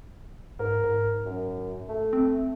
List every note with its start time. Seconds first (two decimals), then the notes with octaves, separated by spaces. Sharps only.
0.59 G#2 A#4
0.84 G#2
1.25 F#2
1.89 A3
2.13 C4